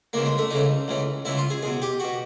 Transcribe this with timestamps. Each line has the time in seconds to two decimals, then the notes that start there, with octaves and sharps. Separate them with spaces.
0.13 C#2 C#3 E3 A#3
0.26 G#3
0.38 A3
0.50 C#2 C#3 E3 D#4
0.88 C#2 C#3 E3
1.25 C#2 C#3 E3 E4
1.38 F4
1.50 G#4
1.62 E2 B2 G#4
1.82 G4
2.00 B2 F#4